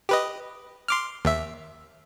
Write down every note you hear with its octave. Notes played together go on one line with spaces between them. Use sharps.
G4 B4 D#5
C6 D6 F6
D#2 E5